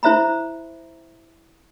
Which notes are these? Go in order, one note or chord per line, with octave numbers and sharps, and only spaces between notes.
E4 C5 E5 A#5 B5